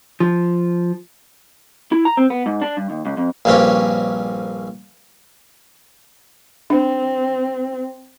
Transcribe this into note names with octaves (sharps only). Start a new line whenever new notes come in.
F3
E4
A#5
C4
B3
G#2
D4
G2
D#2
C#2
F2
A#1 G2 A#3 C4 C#4 G4
C4 D4